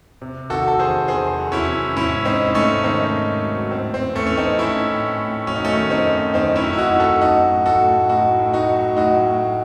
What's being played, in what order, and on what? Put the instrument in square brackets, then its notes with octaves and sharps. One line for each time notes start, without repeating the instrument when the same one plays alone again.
[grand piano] C3
D#3 F#4 A4
A4
D#3 G#4 C5
E2 G#4 C5
F#3
C#4 E4
C3
G#2 C#4 E4
G#2 C4 D#4
D#4
G#2 A3 C#4
D#3 C4 D#4
G#2
F#3
A2 C4
C4
E3
A3 C#4
E3 C#4
C4 D#4
E3 C#4 E4
A2
A2
F#3 C#4
D#4
A3 C#4
D#3
C4 D#4
F#2
D#3 C4 D#4
C#4 E4
F#3
E4
D#4 F#4
F#2
F#4 A4
F#3 D#4 F#4
A2
F#4 A4
A2
A2 D#4 F#4
A2
D#4 F#4
F#3
A2 D#4 F#4
A2